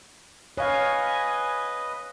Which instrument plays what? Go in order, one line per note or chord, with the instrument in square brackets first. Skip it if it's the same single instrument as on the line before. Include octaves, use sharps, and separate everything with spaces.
[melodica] B4 D#5 [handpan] C#5 F5 [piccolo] G#5